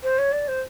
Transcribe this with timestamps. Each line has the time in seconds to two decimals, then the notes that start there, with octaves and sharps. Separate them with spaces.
0.03 C5
0.18 C#5
0.32 D5
0.48 C5